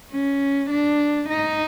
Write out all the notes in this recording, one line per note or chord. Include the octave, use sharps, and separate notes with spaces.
C#4
D4
D#4